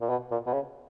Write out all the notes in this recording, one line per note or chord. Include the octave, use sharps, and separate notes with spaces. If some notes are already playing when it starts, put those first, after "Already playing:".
A#2
B2
A#2
B2
C#3